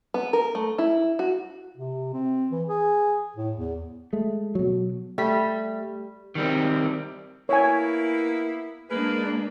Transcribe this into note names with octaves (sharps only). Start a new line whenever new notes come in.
B3
A#4
A3
E4
F#4
C3
C4
E3
G#4
A2
E2
G#3 A3
B2 F#3
G3 A3 B6
D#3 G3 C4
A#3 B3 E4 C#5 G#5
G#3 A#3 D4 G#4 A#4 B4